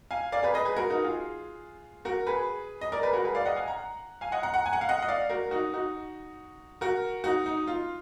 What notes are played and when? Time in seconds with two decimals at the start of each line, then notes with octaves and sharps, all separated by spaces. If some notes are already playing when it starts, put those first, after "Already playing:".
0.11 F5 G#5
0.32 D5 F5
0.43 G#4 B4
0.54 B4 D#5
0.65 G#4 B4
0.77 F#4 A#4
0.90 D#4 F#4
1.04 F4 G#4
2.05 F#4 A#4
2.27 G#4 B4
2.81 D#5
2.92 A#4 D5
3.03 G#4 B4
3.13 F#4 A#4
3.24 G#4 B4
3.35 D5 F5
3.46 D#5 F#5
3.56 F5 G#5
3.68 F#5 A#5
4.21 F5 G#5
4.32 D#5 F#5
4.43 F#5 A#5
4.54 F#5 A#5
4.66 G#5
4.73 F#5
4.81 F5
4.89 D#5 F#5
5.02 D#5
5.08 D5 F5
5.29 F#4 A#4
5.51 D#4 F#4
5.74 D#4 F#4
6.81 F#4 A#4
7.24 D#4 F#4
7.46 D#4
7.67 F4